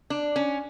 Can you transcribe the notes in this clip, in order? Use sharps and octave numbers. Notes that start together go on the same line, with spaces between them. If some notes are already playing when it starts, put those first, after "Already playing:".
D4
C#4